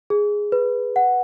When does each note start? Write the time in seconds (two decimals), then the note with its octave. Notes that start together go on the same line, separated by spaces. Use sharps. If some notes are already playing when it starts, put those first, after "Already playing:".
0.10 G#4
0.52 B4
0.96 F#5